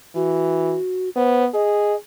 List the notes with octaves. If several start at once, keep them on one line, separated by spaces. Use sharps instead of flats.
E3 F#4
B3 C5
G#4 D#5